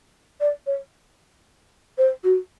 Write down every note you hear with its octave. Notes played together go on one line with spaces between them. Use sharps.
D5
C#5
C5
F#4